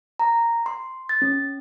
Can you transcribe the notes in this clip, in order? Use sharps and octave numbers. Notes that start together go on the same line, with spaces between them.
A#5
C6
A6
C#4